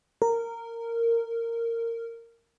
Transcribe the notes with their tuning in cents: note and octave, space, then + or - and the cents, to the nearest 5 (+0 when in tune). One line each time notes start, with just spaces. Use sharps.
A#4 -15